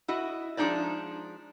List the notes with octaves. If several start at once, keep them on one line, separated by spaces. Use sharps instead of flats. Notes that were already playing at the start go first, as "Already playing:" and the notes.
E4 F#4 D#5
F3 G#3 D4 D#4 C5 D5